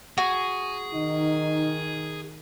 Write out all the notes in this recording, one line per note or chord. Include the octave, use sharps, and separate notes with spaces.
F#4 G#4
D#3 D#4